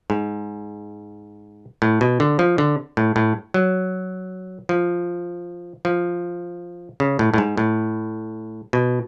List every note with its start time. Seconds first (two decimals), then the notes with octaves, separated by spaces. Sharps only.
0.10 G#2
1.82 A2
2.01 B2
2.20 D3
2.39 F3
2.58 D3
2.97 A2
3.16 A2
3.54 F#3
4.69 F3
5.85 F3
7.00 C#3
7.19 A2
7.34 A2
7.38 G#2
7.57 A2
8.73 B2